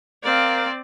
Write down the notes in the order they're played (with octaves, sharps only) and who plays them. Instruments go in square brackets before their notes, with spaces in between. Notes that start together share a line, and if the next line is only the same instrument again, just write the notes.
[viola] C4 D5 [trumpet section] A#4 F5